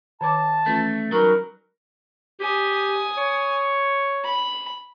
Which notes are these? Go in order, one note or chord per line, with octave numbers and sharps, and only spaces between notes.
D#3 C#5 A5 D6
E3 A3 C#4 F4
E3 F#3 G3 D#4 A#4 C#6
G4 G#5 D#6
C#5
B5